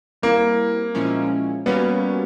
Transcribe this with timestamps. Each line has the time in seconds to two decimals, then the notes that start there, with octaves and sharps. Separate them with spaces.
0.22 G3 A#3 C4 E4
0.95 A#2 F3 G#3 C#4 E4
1.66 G3 A#3 B3 C#4 F#4